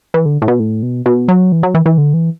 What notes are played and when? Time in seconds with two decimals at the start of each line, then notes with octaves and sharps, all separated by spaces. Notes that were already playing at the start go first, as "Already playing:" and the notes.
0.14 E3
0.26 D3
0.42 A2
0.48 B2
0.59 A2
0.83 B2
1.06 B2
1.28 F#3
1.52 E3
1.63 F#3
1.74 E3
1.86 E3
1.98 D3
2.14 E3